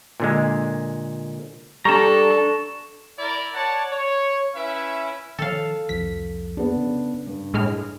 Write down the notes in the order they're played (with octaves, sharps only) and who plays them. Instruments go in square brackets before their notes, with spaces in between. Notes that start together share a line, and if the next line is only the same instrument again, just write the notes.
[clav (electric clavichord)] A#2 D3 G#3
[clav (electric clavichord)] G3 [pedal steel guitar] D4 A#5 [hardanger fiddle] A4 [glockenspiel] C#6 E7
[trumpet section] E4 A#4 D5
C#5 D5 F#5 A5
C#5
C#4 E4 B4 E5
[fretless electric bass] D#3 F3 [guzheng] A4 F5
[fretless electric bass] C2 F2 F3 [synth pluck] B6
[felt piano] B3 D4
[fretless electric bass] C#3
[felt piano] G2
[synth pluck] A2 G#3 F6